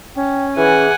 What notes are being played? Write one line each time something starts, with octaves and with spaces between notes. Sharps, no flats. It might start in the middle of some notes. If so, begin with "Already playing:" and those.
C#4 G5
E3 G#4 F#5 G#5